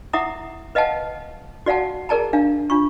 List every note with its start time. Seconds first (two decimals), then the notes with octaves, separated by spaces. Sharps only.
0.13 E4 E5 F#5 A#5 D6 D#6
0.75 B4 D#5 F5 F#5 A5
1.66 F#4 D5 F5 F#5 A5
2.09 G#4 A#4 D5 A5 A#5
2.33 D4 F5
2.70 D4 F4 C#6